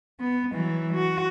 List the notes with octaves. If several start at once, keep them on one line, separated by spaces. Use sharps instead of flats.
B3
E3 F#3
F#4